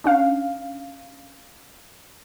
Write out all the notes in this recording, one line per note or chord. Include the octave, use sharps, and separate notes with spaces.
C#4 D4 F5